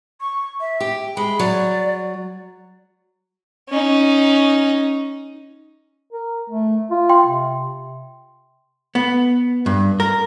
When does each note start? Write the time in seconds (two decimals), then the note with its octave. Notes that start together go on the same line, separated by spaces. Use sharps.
0.21 C#6
0.60 E5
0.80 G4
1.17 G#3 B5
1.40 F#3 D5
3.69 C#4 D#4
6.12 A#4
6.50 A3
6.91 F4
7.10 G5 C6
7.25 C3
8.95 B3
9.66 G2
10.00 A#4